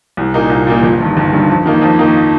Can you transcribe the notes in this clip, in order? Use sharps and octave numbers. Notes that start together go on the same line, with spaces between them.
C2
A#2 A#3 D#4
C2
A#2 A#3 D#4
G1
G2 D#3
G1
G2 D#3
F2
D#3 A#3 D#4
F2
D#3 A#3 D#4